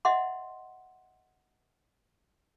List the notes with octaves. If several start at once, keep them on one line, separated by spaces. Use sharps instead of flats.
D#5 E5 F#5 C6